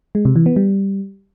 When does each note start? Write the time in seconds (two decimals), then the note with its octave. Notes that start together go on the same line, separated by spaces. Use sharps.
0.15 G#3
0.25 C3
0.36 E3
0.46 B3
0.56 G3